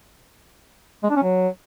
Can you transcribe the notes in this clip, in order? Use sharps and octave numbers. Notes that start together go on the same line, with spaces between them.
G#3
D4
C#4
F#3